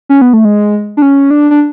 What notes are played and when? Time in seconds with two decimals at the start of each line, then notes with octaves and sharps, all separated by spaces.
0.09 C#4
0.22 B3
0.33 A3
0.45 G#3
0.97 D4
1.02 C#4
1.31 D4
1.51 D4